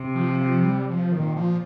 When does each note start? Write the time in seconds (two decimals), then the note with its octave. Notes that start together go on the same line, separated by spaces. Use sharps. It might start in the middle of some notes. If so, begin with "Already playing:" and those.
Already playing: C3
0.15 F3
0.41 F3
0.64 G3
0.89 F3
1.12 A#2 D#3
1.36 F3